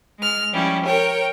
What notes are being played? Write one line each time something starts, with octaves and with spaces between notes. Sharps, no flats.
G#3 F6
F3 G3 C#4 E4
A#4 C#5 G5